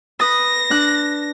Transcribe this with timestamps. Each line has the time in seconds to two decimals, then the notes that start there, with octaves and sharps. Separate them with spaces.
0.20 B4 D#6 A#6
0.70 D4 F#6